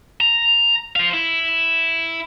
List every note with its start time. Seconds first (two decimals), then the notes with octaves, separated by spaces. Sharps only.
0.20 A#5
0.96 C5 F5
1.13 E4